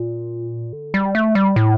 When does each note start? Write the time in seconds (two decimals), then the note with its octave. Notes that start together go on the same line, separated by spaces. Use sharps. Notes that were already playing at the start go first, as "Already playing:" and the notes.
Already playing: A#2
0.73 D3
0.94 G3
1.15 A3
1.35 G3
1.56 A2